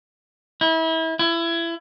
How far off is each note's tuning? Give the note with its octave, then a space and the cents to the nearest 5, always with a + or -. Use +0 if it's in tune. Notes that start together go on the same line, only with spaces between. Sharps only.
E4 -30
E4 +25